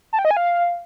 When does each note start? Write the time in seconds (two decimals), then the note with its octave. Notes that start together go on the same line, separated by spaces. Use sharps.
0.13 A5
0.19 G5
0.25 D#5
0.31 G#5
0.37 F5